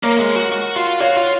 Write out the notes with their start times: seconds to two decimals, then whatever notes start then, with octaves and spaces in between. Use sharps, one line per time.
0.03 A#3 A#4 C#5
0.20 G#3
0.36 F#4
0.52 F#4
0.76 F4
1.01 F#4 C#5 F5
1.17 F4